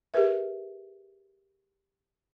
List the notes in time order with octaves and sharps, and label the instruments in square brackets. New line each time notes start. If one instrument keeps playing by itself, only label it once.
[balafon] G4 G#4 A#4 B4 E5